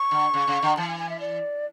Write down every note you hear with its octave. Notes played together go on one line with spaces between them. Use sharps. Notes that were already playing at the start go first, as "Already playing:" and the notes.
Already playing: C#6
D3
C#3
C#3
D3
E3 A5
G#5
G#5
E5
D5